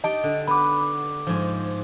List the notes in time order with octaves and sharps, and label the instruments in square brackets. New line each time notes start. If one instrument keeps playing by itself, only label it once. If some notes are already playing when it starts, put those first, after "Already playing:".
[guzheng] D#4 G4 G5 [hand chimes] D#5 A5 D7
[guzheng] D3
[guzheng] B3 [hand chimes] B5 D6
[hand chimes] D6
[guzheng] G#2 F3